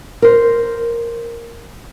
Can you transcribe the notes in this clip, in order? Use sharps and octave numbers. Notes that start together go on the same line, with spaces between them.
A#4 C5